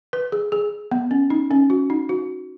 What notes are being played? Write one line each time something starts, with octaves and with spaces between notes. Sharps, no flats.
B4
G#4
G#4
B3
C#4
D#4
C#4
F#4
D#4
F#4